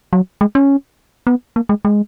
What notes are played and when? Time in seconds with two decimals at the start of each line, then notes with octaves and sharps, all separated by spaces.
0.13 F#3
0.41 G#3
0.55 C#4
1.27 B3
1.56 A#3
1.69 G#3
1.85 G#3